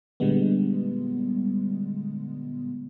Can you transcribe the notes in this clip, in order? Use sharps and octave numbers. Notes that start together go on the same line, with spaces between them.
A#2 D3 G3 G#3 B3